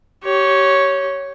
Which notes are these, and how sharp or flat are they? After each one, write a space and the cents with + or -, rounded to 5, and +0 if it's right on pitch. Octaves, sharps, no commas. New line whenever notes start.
G4 -25 C#5 +0